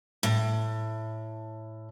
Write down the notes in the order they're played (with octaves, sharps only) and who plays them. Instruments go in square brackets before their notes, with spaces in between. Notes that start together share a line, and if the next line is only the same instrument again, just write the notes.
[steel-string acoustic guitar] A2